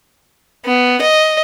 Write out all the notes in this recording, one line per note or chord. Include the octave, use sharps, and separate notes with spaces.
B3
D#5